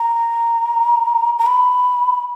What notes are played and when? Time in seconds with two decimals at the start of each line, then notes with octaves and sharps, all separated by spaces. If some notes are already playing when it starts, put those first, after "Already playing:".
Already playing: A#5
1.39 A#5
1.47 B5